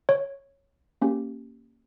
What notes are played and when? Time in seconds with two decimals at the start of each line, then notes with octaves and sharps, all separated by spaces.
0.09 C#5
1.01 A#3 C#4 G4